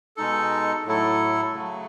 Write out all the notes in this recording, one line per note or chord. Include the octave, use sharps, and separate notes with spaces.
B2 G#3 D#4 A4
A2 F#3 A3 E4 A4
C#3 F#3 A3